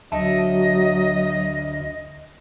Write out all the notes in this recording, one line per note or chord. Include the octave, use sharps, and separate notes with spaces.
D2 F#3 D#5 E5 A5